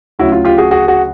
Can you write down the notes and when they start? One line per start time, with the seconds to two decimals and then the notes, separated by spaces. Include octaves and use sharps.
0.19 D2 C#3 F#3 E4 F#4
0.32 F4
0.45 F4 G4
0.58 F#4 G#4
0.71 F#4 G#4
0.88 F#4 G#4